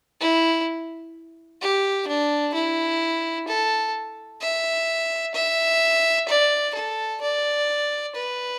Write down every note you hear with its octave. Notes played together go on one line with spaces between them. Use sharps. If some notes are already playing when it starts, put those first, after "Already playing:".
E4
G4
D4
E4
A4
E5
E5
D5
A4
D5
B4